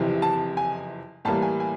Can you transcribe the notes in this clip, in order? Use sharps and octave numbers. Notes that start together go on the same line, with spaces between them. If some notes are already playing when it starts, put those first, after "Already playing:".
Already playing: F#1 F2 C3 E3
A5
G#5
A2 E3 G3 A#3 A5
G#5
G#5